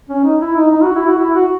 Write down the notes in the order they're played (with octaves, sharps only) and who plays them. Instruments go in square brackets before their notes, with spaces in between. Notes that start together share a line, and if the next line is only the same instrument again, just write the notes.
[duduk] C#4
D#4
E4
D#4
D#4
F#4
E4
F#4
E4
F#4